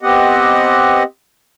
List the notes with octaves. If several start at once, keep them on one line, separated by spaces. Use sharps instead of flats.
B3 C4 G4 D#5 F#5